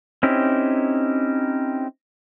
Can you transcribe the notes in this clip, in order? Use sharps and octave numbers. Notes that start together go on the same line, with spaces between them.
C4 C#4 D#4 E4 G4